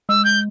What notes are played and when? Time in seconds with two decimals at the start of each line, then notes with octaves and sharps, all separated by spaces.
0.09 G#3 E6
0.24 G6